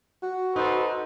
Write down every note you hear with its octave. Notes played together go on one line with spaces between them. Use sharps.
F#4
D#4 A4 B4 C5